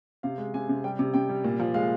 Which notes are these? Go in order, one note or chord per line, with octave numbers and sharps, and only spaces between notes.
C3 F5
G#3
C3 G#5
C3
G3 G5
C3
C3 G5
G3
A#2
F3
G#3 F5